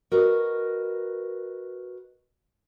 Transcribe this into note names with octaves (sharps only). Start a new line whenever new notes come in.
F#4 A#4 B4 D#5